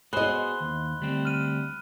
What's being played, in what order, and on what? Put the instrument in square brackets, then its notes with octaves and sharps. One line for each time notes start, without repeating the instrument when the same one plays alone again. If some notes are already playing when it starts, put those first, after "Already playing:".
[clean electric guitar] B3 F#4 G#4 [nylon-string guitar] C5 D#5 [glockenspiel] B5 F#6 G7
[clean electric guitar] D#2
D2 G3 C4
[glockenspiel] F6 D#7